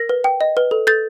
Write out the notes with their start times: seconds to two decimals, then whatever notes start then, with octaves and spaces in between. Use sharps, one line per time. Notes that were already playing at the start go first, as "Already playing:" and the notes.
Already playing: A#4 A#6
0.09 B4
0.24 G5
0.41 D#5
0.57 B4
0.71 A4
0.87 A4 G6 A6